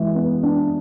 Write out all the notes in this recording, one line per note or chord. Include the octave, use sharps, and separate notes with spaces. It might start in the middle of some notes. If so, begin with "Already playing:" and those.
Already playing: E3 G#3
B3
D4